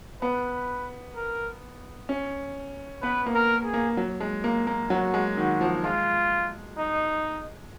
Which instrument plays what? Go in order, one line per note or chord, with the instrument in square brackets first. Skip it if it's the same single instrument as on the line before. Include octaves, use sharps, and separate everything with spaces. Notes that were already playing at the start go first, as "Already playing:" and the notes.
[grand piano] B3 [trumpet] B4
[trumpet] A#4
[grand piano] C#4
[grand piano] B3 [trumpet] B4
[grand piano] A#3
[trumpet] A#4
G#4
[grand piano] A#3
F#3
G#3
A#3
A#3
[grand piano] F#3 [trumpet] F#4
[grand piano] G#3
[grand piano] D#3 [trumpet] F#4
[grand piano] F3
[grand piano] G#3 [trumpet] F4
[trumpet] D#4